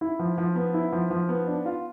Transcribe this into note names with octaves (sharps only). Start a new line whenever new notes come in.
E4
F3
F3
B3
E4
F3
F3
B3
D4
F4